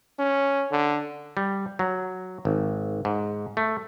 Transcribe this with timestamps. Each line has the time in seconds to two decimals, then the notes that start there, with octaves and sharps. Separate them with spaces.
0.19 C#4
0.71 D3
1.37 G3
1.79 F#3
2.45 G#1
3.05 G#2
3.57 A3